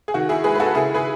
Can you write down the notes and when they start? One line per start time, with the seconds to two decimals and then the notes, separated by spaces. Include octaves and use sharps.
0.08 G#4
0.14 D#3 F#4
0.29 E4 G#4
0.44 G#3 G#4 B4
0.56 B4
0.60 F#4 A4
0.74 C#3 E4 G#4
0.94 G#4 B4